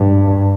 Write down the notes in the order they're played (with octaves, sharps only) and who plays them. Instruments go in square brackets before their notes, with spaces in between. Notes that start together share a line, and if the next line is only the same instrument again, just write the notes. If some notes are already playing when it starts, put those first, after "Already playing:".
Already playing: [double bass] G2